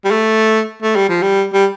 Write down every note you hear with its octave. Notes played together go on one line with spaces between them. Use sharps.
G3
A3
A3
G3
F3
G3
G3